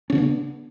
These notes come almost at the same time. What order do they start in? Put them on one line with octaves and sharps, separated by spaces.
C#4 C#3 D4 B3